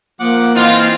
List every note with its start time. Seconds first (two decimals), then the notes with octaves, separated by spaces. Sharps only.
0.20 F3 A#3 F#5 D6
0.55 E3 C4 D#4 F4